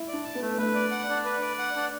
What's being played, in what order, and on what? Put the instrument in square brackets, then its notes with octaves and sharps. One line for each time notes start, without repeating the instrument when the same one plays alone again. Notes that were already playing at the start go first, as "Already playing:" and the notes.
Already playing: [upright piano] E4
[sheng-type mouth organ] D5
[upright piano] D4
[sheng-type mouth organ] A5
[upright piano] B3
[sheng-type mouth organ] A3
[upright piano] A3 [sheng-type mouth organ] B4
[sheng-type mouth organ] D5
F#5
D4
B4
D5
F#5
D4